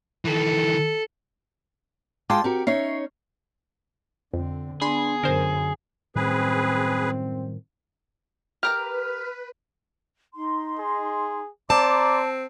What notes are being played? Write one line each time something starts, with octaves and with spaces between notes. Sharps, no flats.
D#3 E3 A4
G#3 F4 G5 A5 C6 D6
C4 F#4 G4 A#4
C#4 D#4 C#5 E5 C7
F2 D3 C4
B3 D4 G#4 B5 C6
F#2 D3 A#4 C5
F#2 A2 D#3 G3 C4 G#4 B4
G4 A#4 B4 A#5 F6
D#4 C6
G#4
C4 D5 A5 A#5 C6 D6